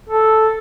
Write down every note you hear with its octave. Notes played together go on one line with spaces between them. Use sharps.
A4